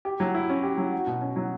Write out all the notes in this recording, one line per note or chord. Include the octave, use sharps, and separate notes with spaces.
G4
F#3
E4
C#4
G4
F#3
F#4
B2
C#4
F#3